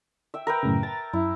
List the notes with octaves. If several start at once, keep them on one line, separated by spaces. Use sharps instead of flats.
E5 G5
A#4 B4 G5
F#2 A2 C#3
A#5 A6
F#2 E4